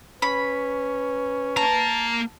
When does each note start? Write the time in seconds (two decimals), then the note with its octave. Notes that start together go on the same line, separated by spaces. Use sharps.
0.22 C#4 B4 B5
1.57 A#3 A5 A#5